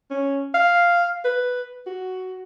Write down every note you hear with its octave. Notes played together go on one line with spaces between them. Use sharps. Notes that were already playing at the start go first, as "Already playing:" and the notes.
C#4
F5
B4
F#4